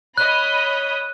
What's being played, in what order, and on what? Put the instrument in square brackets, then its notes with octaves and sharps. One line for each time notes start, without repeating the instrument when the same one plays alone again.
[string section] C#5 D#5 B5 [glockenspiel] F#6